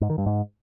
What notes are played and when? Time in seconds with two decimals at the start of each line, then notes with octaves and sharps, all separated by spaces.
0.01 G#2
0.10 D#3
0.18 G2
0.26 G#2